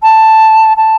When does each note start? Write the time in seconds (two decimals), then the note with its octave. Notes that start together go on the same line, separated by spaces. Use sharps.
0.02 A5
0.77 A5